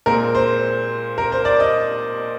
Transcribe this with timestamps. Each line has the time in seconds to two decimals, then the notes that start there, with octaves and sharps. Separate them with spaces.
0.06 A#2 G#3 C4 A#4
0.35 C5
1.18 A#4
1.32 C5
1.45 D5
1.60 D#5